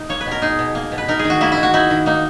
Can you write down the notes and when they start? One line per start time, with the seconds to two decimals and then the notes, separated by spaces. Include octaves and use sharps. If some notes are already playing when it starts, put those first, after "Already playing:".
Already playing: D#4
0.09 A#3 C#5
0.21 B4
0.26 B2
0.31 A#4
0.42 D#4 G#4
0.59 B2
0.75 A#3
0.92 B2
0.98 B4
1.08 D#4 A#4
1.19 G#4
1.24 D#3
1.30 F#4
1.41 A#3 E4
1.52 E4
1.57 D#3
1.63 F#4
1.74 D#4 E4
1.90 D#3
2.06 A#3 D#4